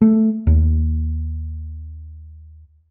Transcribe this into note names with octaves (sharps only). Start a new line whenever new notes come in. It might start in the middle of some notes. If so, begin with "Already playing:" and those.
A3
D#2